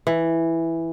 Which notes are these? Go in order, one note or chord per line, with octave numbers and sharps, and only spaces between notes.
E3